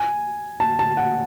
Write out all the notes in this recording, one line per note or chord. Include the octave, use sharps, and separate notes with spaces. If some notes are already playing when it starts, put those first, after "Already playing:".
Already playing: G#5
A5
A5
F#5